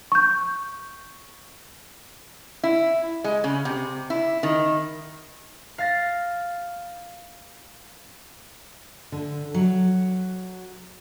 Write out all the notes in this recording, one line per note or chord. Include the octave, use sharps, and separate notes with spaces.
C#6 G6
E4
G#3
C#3
C3
E4
D#3
F5 A6 A#6
D3
F#3